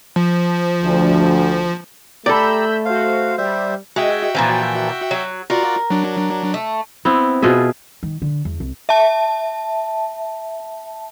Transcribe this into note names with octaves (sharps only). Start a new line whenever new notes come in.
F3
D2
A3 G4 A4 D5 A#5 B5 E6 G6
F#4 C5 F5
G3 C5 E5
G#3 F#4 E5 G5
A#2 E3 F3
F#3
F4 F#4 A#4 D5
F#3 D4
A3
B3 C4 E4
B2 F4 G#4 E5
D#3
D3
E2
C2
E5 A5